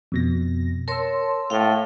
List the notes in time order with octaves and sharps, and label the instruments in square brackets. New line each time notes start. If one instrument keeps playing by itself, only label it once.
[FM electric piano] F2 B2 A#6
[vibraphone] A#4 C#5 C6 [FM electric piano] A5 E6
[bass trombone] A2 [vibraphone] F5 G5